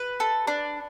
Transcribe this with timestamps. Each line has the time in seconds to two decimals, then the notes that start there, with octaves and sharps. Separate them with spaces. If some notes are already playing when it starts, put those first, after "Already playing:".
Already playing: B4
0.20 A4
0.47 D4